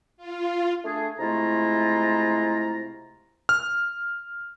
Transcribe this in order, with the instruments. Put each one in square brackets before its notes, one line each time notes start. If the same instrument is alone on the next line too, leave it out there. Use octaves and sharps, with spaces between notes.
[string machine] F4
[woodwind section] A3 D4 G#4
C3 G#3 A3 E4 F4 A#5
[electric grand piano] F6